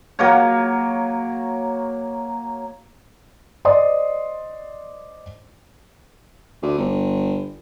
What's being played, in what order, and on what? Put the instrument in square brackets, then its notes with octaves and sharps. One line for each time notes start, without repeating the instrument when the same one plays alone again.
[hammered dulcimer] F#3 A#3 C#5
[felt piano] C5 D5 D#5 C6 D#6
[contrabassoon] D2
G1